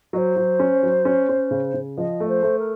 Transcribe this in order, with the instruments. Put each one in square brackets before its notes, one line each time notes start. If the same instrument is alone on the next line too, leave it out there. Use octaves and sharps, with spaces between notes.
[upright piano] F#3 [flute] D#5
[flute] C5
[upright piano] F#3
C#4
F#3
C#4
C#4
C#3
C#3
[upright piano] F3 [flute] D#5
[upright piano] A3
[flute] C5
[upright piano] A3
[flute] A#4